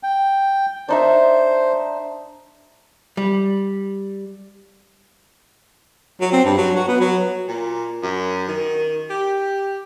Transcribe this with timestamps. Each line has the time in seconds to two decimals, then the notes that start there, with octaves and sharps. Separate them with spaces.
0.03 G5
0.88 D4 D#4 C5 E5
3.17 G3
6.21 F#3
6.32 C4
6.45 G2
6.58 F#3
6.76 F#4
6.88 B3
7.00 F#3
7.48 A#2
8.03 F#2
8.48 D#3
9.10 G4